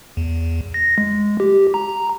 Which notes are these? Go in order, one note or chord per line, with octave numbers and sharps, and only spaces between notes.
E2
A#6
G#3
G4
A#5